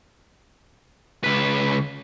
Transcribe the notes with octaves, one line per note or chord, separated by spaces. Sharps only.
C#2 B4